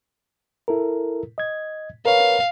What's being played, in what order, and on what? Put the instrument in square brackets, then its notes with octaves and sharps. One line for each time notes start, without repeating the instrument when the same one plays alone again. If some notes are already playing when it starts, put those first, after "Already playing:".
[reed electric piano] E4 A4 A#4
D#5 G#6
[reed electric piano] A#4 B4 C#5 [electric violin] F5